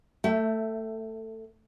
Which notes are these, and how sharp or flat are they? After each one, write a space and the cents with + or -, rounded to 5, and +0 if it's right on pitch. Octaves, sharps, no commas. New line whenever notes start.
A3 +15 E5 +0 G5 -45